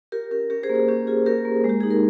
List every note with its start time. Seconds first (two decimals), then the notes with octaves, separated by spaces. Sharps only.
0.12 F4 G4 A#4
0.31 C#4 G4 A#4
0.50 C#4 G4 A#4
0.63 G#4 C5
0.69 A#3
0.75 G#4
0.88 C#4 G4
1.07 F4 G#4
1.26 C#4 G4 A#4
1.45 A#3
1.64 G#3
1.69 G4
1.80 D#4 G#4
1.91 A#4